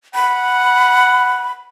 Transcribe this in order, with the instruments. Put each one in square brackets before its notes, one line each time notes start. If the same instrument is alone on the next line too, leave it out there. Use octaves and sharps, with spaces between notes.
[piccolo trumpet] F#5 [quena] B5